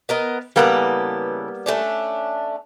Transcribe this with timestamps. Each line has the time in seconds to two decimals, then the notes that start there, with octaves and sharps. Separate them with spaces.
0.09 B3 A#4 D#5
0.56 C#3 E3 G3 A#3 B3 A4
1.66 A3 C#4 D4